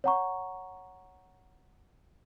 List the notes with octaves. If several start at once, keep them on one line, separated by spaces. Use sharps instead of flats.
C#5 F#5 A#5 C#6